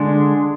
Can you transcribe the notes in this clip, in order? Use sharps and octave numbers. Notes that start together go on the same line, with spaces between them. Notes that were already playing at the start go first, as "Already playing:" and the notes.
Already playing: D3 G#3 D4 G#4